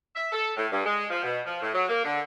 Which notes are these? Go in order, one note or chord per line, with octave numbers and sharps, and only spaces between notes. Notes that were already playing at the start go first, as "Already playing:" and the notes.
E5
A4
A2
G2
G#3
F3
B2
F3
A2
F#3
A#3
D3